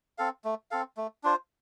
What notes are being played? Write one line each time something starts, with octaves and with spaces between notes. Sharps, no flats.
C4 A4 F5
A3
C4 A4 F5
A3
D4 F4 C5